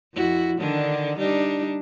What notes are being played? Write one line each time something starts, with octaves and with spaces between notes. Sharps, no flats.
F2 E4 F#4
D3 D#3 D4
G3 D4 D#4